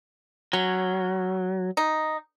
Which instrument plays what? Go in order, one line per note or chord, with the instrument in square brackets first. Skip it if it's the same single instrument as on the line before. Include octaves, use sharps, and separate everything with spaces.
[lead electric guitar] F#3 [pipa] C#4
[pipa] D#4